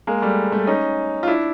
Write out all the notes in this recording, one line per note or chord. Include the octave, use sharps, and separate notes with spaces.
G#3 A#3
G3 A3
G3 A3
C#4 D#4
F4
D4 E4